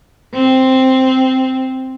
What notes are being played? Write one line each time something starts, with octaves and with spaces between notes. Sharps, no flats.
C4